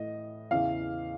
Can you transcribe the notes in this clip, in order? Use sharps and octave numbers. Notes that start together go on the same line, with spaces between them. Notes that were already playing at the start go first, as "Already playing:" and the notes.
Already playing: A2 E3 D#5
E2 C#3 E3 F5